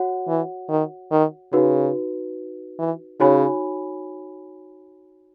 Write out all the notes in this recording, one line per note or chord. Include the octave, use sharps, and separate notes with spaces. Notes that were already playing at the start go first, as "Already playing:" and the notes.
Already playing: F#4 C#5 F#5
E3
D#3
D#3
C#3 D#4 F#4 B4
E3
C#3 D#4 F#4 C#5 G#5 B5